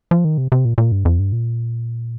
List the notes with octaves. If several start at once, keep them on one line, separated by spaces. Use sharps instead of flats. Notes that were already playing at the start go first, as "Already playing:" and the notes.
F3
D#3
C3
C3
A#2
A#2
G2
F2
G2
A#2